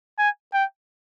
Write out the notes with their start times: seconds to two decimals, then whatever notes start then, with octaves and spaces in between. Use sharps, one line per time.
0.19 G#5
0.54 G5